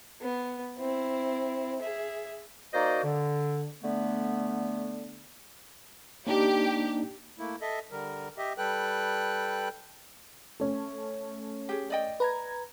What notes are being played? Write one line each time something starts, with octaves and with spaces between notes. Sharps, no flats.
B3
C4 E4
G#4 E5
A#3 D#4 F#4 C5 D5 D#5
D3
D3 A3 B3
A#3 D4 D#4 G4
A3 A#3 E4
A4 D#5 E5
D3 G3 A#4
G4 D#5 E5
G3 A4 B4 G5 F#6
A3 C#4
G4 G#4
D5 D#5 G5
B4 A#5 G#6